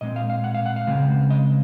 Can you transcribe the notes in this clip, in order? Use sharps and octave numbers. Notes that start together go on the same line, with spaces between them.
A#2 G#3 C4 D#5
F5
F5
F#5
F5
F#5
F5
C#3 G#3 C4
D#5